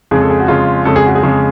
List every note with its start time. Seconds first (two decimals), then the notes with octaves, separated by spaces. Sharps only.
0.11 F2 C#3 G#3 G#4
0.21 A4
0.30 G#4
0.40 F#4
0.48 F2 C#3 G#3 F4
0.85 F2 C#3 G#3 A4
0.96 G#4
1.06 F#4
1.15 G#4
1.23 F2 C#3 G#3